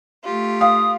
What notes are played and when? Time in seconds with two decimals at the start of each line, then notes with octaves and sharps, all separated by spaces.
0.24 A3 F4 G4
0.61 F5 D#6